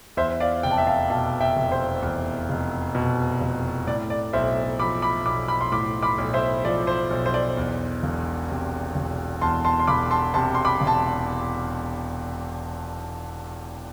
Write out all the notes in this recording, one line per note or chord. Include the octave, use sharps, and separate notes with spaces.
E2 C5 E5
D5 F5
F1 G5
A5
E5 G5
F5 A5
B2 F5 A5
E5 G5
F1
C5
E2
F1
B2
F1
A2 D5
D5
B1 C5 E5
F3 B5 D6
B5 D6
B1 B5 D6
B5 D6
C6
A2 B5 D6
B5 D6
B1
C5 E5
F3 D5
C5
B1
C5
D5
E2
E1
C3
E1
E2 A5 C6
A5 C6
C6
E1 B5 D6
A5 C6
C3 A5 C6
C6
B5 D6
E1
A5